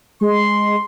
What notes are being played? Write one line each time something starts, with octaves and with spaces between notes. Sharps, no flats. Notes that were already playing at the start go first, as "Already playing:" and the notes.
G#3 C6